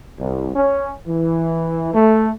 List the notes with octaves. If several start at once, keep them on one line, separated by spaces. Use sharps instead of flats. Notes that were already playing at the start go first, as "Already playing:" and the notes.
C2
C#4
E3
A3